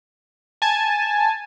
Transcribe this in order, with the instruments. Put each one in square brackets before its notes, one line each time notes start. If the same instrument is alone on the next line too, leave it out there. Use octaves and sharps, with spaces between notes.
[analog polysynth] G#5 A5